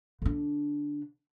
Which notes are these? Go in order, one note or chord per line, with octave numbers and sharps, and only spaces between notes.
D3 D4